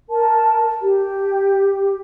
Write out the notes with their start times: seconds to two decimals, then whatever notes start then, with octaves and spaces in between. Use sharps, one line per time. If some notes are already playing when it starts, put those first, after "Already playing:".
0.10 A#4 A5
0.82 G4